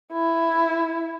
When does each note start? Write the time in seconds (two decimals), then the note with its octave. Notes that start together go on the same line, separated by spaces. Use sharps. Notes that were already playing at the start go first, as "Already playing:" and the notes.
0.13 E4